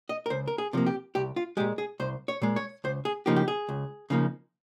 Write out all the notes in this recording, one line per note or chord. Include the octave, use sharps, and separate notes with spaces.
D#5
A#4
C#2 C5
A#4
G#4
C3 F3 A#3
G4
C2 G4
F4
A#2 G#3 G4
G#4
C2 C5
C#5
A#2 G#3
C#5
C#2 C5
G#4
C#3 F3 A#3 D#4 G4
G4
G#4
C#2
C#3 F3 A#3 D#4